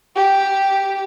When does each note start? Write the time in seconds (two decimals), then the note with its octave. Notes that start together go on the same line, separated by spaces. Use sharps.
0.16 G4